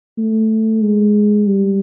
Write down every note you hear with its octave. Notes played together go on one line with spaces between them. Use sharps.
A3
G#3
G3